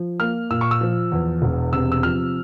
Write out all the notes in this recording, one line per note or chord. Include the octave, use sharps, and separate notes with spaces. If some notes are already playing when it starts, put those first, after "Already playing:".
Already playing: F3
A#3 F6
A#2 E6
C#6
E6
F3
E2
E1
C3 E6
E6
F3 F6